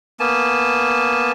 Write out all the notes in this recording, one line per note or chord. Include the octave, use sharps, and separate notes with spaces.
A#3 B3 G#5 A5